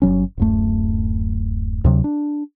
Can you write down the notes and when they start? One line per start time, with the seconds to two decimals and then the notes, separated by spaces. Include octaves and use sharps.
0.02 G1 F#2 F#3 C#4
0.38 D1 F#2 A3
1.84 D2 C3 F#3
2.04 D4